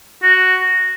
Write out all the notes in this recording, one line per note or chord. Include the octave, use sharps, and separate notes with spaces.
F#4